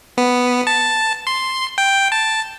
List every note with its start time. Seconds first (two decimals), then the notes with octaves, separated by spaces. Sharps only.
0.18 B3
0.67 A5
1.27 C6
1.78 G5
2.12 A5